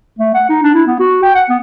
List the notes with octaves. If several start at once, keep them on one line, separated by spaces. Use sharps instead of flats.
A3
F#5
D#4
D4
E4
B3
F#4
G5
F#5
B3